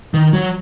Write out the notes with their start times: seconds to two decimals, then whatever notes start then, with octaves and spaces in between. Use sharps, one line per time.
0.14 D#3
0.33 F#3